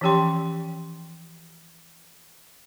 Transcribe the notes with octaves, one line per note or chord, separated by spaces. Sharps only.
E3 F3 C#4 G4 G5 C6